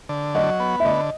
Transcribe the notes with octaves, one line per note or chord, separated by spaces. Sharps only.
D3
F#3 D#5
B3
E5
D3 D#5